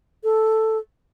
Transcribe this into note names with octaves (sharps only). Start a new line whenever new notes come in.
A4